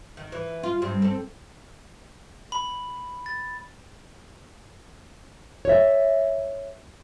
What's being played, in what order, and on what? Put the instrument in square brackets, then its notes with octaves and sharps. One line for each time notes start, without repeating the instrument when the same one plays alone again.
[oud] D#3
E3
F4
G2 C4
C4 A4
[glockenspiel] B5
A6
[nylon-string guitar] C#5 E5